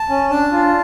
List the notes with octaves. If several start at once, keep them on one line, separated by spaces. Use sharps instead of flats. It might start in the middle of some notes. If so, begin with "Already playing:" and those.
Already playing: A5
C#4
D4 A5
F4